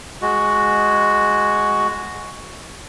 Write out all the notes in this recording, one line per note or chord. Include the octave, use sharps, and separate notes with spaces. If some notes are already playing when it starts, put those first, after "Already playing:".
G#3 F#4